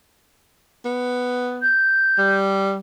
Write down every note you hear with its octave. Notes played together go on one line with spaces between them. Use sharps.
B3
G6
G3